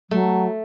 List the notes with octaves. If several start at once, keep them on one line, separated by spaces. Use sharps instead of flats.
F#3 A3